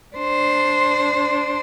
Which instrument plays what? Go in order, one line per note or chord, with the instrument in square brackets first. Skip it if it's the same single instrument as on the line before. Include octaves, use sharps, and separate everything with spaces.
[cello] D4 C5